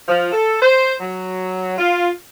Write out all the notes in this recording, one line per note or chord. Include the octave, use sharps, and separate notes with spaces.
F3
A4
C5
F#3
F4